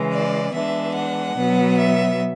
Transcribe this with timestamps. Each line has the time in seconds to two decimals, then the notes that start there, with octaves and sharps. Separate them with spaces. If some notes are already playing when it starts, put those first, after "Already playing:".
Already playing: C#3 E3 G#3
0.12 D5
0.54 E3 G#3 B3 D4 E5
0.95 F#5
1.36 B2 F#3 B3
1.78 E5